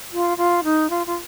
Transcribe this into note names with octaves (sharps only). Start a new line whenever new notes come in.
F4
F4
D#4
F4
F4